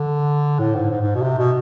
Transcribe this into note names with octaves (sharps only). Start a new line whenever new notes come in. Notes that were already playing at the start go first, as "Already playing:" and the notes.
Already playing: D3
A2
G#2
G#2
G#2
B2
C3
B2